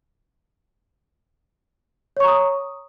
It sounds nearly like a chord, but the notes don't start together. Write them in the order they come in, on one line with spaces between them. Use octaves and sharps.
C#5 C#6 A#5 D#6